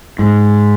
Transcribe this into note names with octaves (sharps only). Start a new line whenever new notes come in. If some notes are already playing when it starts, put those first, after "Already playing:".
G#2